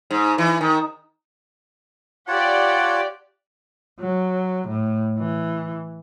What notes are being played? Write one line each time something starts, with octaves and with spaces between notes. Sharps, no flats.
G#2
E3
D#3
F4 G4 C#5 D5 F#5 A5
F#3
A2
E3